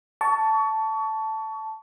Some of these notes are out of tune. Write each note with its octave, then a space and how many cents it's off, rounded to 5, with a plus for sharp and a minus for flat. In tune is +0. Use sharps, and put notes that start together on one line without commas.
A5 +0 C#6 +30